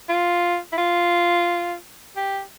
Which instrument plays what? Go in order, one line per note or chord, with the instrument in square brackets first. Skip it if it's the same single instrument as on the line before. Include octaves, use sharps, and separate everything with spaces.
[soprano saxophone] F4
E4
F4
G4